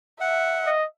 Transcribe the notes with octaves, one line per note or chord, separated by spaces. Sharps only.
E5 F#5
D#5